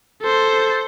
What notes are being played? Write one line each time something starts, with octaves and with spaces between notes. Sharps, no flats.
A4 C5